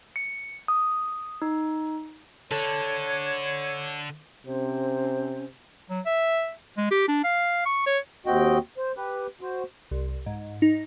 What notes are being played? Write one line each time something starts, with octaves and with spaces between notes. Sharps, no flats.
C#7
D#6
D#4
D3 A4 C#5
C3 C#4 C5
F#3
E5
G#3
G4
D4
F5
C#6
C#5
D#2 C4 F#4 D#5 G5
C5
G4 B4
F#4 C5
C2
G#2
D#4